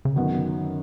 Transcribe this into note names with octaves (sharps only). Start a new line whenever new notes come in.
C#3
F#2 D3 D#3 F#3 B3